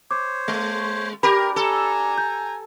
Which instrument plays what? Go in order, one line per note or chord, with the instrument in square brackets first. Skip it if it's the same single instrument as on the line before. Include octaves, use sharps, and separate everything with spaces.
[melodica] C5 C#5 [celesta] D6
[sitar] G#3
[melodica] D4 [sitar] G4 A#4 [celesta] B5
[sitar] A4 [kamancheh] G#5 A#5
[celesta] G6